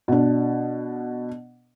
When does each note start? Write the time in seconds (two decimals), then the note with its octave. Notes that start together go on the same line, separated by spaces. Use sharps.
0.08 B2 D4